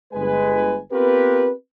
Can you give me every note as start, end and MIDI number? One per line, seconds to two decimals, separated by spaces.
0.13 0.78 31
0.13 0.78 56
0.13 0.78 71
0.13 0.78 80
0.91 1.50 59
0.91 1.50 60
0.91 1.50 65
0.91 1.50 67
0.91 1.50 70
0.91 1.50 71